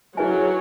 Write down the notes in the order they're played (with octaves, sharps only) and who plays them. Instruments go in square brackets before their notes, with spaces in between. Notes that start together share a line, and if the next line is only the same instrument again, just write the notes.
[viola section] F#3 [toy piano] E4 G#4 B4 E5 G#5